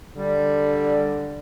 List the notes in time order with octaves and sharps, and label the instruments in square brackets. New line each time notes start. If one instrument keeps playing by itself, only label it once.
[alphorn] D3 [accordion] G3